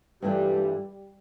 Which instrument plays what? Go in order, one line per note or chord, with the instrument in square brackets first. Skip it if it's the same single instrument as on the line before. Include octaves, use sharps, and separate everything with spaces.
[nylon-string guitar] G2 E3 A3 D4 F4 [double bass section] G3